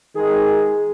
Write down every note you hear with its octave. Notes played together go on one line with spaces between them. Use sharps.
D#3 G#3 G#4